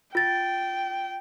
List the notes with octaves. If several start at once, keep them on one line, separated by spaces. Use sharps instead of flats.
F4 G5 A6